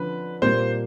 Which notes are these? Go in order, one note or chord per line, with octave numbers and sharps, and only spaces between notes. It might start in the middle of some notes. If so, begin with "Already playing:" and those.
Already playing: D3 F3 C#4 B4
A#2 G3 A#3 C5